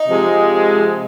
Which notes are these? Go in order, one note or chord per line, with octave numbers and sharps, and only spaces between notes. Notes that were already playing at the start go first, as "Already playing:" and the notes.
Already playing: D#4
C3 F3 G#3